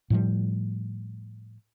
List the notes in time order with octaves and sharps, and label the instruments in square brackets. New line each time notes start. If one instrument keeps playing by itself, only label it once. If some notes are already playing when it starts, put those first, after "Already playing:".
[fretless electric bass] A2 F3 G3